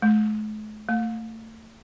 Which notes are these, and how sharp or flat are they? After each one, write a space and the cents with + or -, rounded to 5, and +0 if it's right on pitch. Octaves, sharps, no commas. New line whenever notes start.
A3 -45
A3 +30